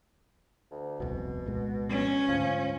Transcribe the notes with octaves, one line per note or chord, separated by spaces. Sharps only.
D2
D#1 C2 F2 B2
C2 A#2 G#3
C#4
D2 G#2 F3